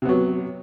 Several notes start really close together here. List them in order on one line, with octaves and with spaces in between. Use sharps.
C3 B3 F#3